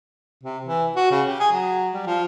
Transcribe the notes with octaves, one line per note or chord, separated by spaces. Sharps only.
C3
E3
F#4
C#3
G4
G#4
F#3
G3
F3